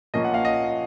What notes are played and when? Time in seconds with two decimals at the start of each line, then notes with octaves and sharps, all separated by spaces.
0.14 A#2 F3 A#3 C#4 D#5
0.24 F#5
0.34 F5
0.45 D#5